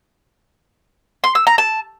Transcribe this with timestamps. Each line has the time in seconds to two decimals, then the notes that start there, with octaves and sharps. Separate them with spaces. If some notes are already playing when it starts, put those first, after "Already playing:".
1.24 C6
1.35 E6
1.47 A#5
1.58 A5